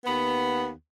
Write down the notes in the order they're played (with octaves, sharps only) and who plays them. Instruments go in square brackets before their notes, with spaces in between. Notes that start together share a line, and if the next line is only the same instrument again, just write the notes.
[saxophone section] D#2 B3